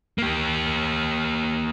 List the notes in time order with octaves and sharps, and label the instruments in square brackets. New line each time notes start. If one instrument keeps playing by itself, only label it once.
[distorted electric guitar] A#3 G4